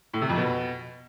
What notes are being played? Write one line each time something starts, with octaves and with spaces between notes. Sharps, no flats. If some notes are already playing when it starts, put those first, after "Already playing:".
A2
C3
F2
B2